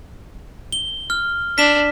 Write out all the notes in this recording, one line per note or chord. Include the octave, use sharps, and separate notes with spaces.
G7
F6
D4 B6 E7